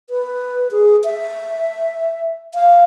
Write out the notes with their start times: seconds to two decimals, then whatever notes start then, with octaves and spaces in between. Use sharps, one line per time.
0.10 B4
0.71 G#4
1.04 E5
2.54 F5